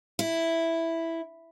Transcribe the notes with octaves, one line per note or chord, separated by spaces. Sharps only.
E4